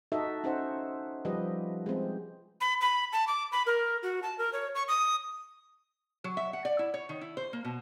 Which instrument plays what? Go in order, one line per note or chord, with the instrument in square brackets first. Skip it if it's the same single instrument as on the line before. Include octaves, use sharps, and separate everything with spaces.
[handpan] D#4 F#4 A4 D#5 E5
C#4 D#4 C5 F#5
F3 G3 G4 B4 D#5
G#3 C4
[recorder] B5
B5
A5
D6
B5
A#4
F#4
A5
A#4
C#5
C#6
D#6
[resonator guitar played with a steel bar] F#3
E5
F#5
D5
E4
C#5
D#3
E4
C5
A#3
B2